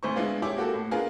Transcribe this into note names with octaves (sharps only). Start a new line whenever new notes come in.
G#1 D2 C5 C#6
G#3 B3 D4 E4 F4
E4 G4 G#4 C#5 E5 D6
A#3 F#4 G4 A4
A2
B3 D4 F4 G#4 A#4